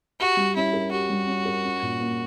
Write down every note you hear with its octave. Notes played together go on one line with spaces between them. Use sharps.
F#4 G4
G3
C#4 E4
A#4
F#4 G4
G3
C#4
A#4
C#4
A#2
A#3